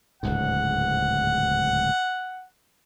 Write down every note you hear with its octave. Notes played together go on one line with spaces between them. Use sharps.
D1 C#2 G#2 F#5